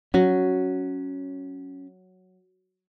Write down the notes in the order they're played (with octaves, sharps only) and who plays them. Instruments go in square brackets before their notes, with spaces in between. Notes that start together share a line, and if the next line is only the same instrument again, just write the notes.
[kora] F#3 [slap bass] C#4